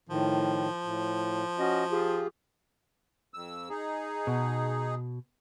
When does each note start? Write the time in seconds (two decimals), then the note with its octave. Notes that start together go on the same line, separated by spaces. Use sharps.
0.09 A2 D#3 F3
0.84 A2
1.59 C#4 F#4 D#5
1.91 F4 G4 G#4
3.34 F2 E6
3.70 D#4 G#4
4.27 B2